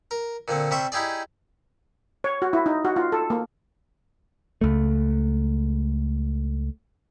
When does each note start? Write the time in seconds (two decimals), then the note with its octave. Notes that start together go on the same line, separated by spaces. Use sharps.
0.11 A#4
0.48 A#2 D3 C4
0.71 C3 G3 E5 C6 C#6
0.92 D#4 E4 G4 G#4 D5
2.24 C#5
2.42 F#4
2.53 E4
2.66 D#4
2.85 F#4
2.96 F4
3.12 A4
3.30 A#3
4.61 C#2 A3